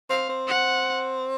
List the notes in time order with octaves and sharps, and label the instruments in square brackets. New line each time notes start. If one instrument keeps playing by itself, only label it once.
[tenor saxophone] C4 [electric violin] F5
[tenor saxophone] C4
[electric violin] F#5